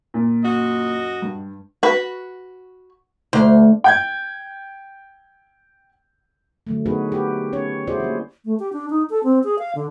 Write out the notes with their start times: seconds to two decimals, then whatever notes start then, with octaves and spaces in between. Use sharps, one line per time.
0.14 A#2
0.44 F#2 F#4 D#5
1.22 G2
1.83 F#4 B4
3.33 D2 C5
3.84 G5 G6 G#6
6.67 D3 F#3 A3
6.86 B3 D#4 F#4 G#4 A#4 B4
7.12 G4 B4
7.53 C#4 C#5
7.87 E4 F#4 G#4 C5 D5
8.00 G3 A#3
8.45 A3
8.59 G4
8.73 D4
8.90 D#4
9.10 A4
9.24 C4
9.44 G#4
9.59 F5
9.75 D3